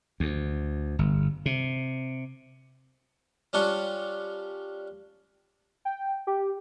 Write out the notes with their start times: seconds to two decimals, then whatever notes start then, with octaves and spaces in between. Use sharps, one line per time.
0.20 D2
0.99 G1
1.46 C3
3.53 G3 C#4 D4 F4 C#6
5.85 G5
6.27 G4